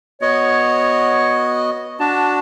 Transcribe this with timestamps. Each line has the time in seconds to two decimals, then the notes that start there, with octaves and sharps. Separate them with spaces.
0.22 B3 F#4 C#5 D#5
2.00 D4 F#4 A5